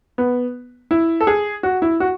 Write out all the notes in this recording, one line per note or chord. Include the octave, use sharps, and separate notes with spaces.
B3
E4
A4
G#4
F#4
E4
F#4